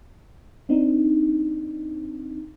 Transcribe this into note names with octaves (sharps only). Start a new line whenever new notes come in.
C4 D4 D#4